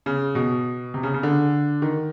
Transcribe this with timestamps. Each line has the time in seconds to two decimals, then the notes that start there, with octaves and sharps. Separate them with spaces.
0.06 C#3
0.35 B2
0.94 C3
1.03 C#3
1.14 C#3
1.23 D3
1.82 D#3